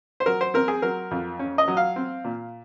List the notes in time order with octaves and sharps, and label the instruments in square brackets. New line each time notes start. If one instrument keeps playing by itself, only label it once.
[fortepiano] C5
F#3 A#4
C5
C4 A#4
G#4
F#3 A#4
F2
C#4
D#5
F#3
F5
C4
A#2